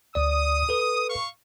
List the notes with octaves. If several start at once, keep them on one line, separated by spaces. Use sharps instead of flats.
D2 D5 D#6
A4 B4
F5 C#6